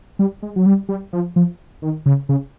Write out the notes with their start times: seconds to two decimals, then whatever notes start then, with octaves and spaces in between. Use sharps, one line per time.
0.19 G3
0.43 G#3
0.56 F#3
0.66 G3
0.89 G3
1.13 F3
1.36 F3
1.82 D#3
2.06 C#3
2.29 C#3